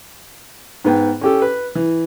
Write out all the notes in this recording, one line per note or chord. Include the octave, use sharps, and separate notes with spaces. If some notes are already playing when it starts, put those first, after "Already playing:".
G#2 B3 G5
C#4 G4 A4
B4
E3